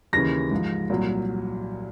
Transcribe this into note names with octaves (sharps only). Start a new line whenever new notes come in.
D#2 C#3 E3 A#6
G#2 F3
C2 A#2 F#3